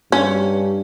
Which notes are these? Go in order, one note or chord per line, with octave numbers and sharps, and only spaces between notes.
G2 C#4